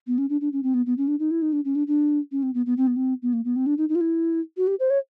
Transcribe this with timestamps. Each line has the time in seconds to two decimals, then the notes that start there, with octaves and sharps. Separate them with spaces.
0.07 B3
0.18 C#4
0.30 D4
0.41 D4
0.53 C#4
0.63 C4
0.74 B3
0.86 B3
0.97 C#4
1.08 D4
1.19 D#4
1.31 E4
1.42 D#4
1.53 D4
1.65 C#4
1.75 D4
1.87 D4
2.32 C#4
2.43 C4
2.54 B3
2.66 B3
2.77 C4
2.87 B3
2.96 C4
3.22 B3
3.33 A#3
3.45 B3
3.56 C4
3.66 D4
3.78 D#4
3.89 D#4
3.95 F4
4.01 E4
4.57 F#4
4.67 G4
4.80 C5
4.90 C#5